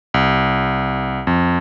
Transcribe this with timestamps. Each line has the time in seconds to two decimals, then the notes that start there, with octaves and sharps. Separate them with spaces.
0.14 C2
1.27 F2